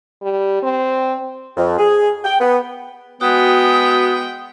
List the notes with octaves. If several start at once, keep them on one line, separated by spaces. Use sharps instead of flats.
G3
C4
F2
G#4
G5
B3
G#3 B3 F#4 G5 D#6